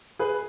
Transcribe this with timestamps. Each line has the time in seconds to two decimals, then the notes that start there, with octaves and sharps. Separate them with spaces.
0.19 G#4 B4